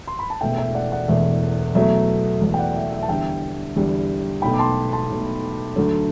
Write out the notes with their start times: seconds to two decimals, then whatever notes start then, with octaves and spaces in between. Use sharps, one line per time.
0.07 C6
0.19 B5
0.30 A5
0.41 E1 E2 B2 A3 E5 G5
0.58 E5 G5
0.74 D5 F#5
0.92 D5 F#5
1.08 E1 E2 B2 A3 E5
1.75 E2 B2 F#3 A3 E5
2.42 E2 B2 F#3 A3 E5
2.54 G5
2.58 D5 F#5
2.76 E5
2.92 E5
3.03 A5
3.09 E2 D3 G3 E5 G5
3.76 E2 D3 G3
4.42 B1 B2 A3 G5 B5
4.54 D6
4.59 A5 C6
4.93 A5 C6
5.10 B1 B2 A3
5.76 D2 D3 F#3 A3